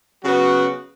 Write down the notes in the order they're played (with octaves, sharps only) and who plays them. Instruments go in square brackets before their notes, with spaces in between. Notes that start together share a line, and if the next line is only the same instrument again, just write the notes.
[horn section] C#3 F#3 B3 F#4